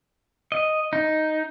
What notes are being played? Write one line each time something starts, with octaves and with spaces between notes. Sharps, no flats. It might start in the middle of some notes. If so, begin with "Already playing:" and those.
D#5
D#4